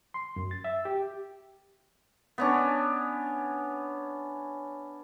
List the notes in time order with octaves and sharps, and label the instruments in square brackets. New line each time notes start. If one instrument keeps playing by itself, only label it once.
[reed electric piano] C6
F#2
A6
E5
G4
[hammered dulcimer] B3 C#4 D4